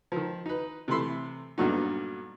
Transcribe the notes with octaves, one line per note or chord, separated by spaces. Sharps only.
D#3 F3
D#4 B4
C3 E3 A3 B5 C6 E6
G2 A#2 D3 F#3 B3 D#4